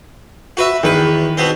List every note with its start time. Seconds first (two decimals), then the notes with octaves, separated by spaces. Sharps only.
0.57 F#4 B4 E5
0.83 E2 D#3 B4
1.37 B2 B3 C4